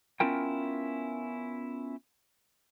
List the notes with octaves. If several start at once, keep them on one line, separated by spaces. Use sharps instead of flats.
B3 C#4 E4 F4 A#4 G5